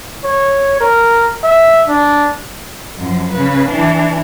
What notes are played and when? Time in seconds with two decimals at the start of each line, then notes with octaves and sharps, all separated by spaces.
0.24 C#5
0.81 A#4
1.44 E5
1.88 D4
2.98 F#2 F3
3.32 C#3 B4
3.68 E3 D4